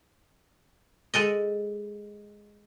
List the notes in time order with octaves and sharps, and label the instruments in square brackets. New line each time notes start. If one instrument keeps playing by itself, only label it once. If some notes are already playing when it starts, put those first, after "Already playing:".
[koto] G#3 A4 D#5